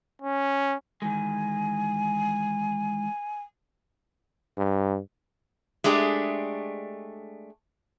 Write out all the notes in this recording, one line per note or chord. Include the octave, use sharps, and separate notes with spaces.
C#4
D#3 E3 G#3 G#5
G2
G#3 A3 D4 G4 G#4